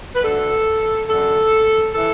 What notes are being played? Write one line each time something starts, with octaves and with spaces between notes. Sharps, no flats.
B4
D2 D3 A4
F#2 D3 A4
E3 A4